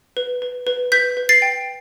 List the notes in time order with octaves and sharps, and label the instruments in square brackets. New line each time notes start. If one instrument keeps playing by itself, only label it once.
[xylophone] B4
B4
B4
B4 G6 B6
B4
A6 C7
G5